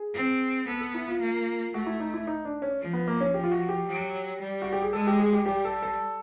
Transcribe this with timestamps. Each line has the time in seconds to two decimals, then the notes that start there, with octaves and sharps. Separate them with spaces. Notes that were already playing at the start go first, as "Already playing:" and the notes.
Already playing: G#4
0.14 C4
0.67 B3 A4
0.81 A4
0.94 E4
1.08 F4
1.21 A#3
1.74 A3 F#4
1.87 E4
2.00 D#4
2.14 E4
2.27 D#4
2.45 D4
2.62 C#4
2.81 F3
2.93 B3
3.08 A#3
3.21 C#4
3.34 F3 G4
3.44 F4
3.52 F#4
3.69 G4
3.87 F#3
4.40 G3
4.62 F#4
4.73 G4
4.82 G#4
4.93 G#3 A4
5.07 G4
5.20 G#4
5.33 G4
5.46 G3 G4
5.65 A4
5.83 A4